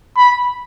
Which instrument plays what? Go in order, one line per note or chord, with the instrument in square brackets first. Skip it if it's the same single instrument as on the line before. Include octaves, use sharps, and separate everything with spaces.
[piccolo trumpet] B5